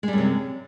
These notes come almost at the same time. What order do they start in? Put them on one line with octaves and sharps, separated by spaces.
G#3 G3 F#2 C3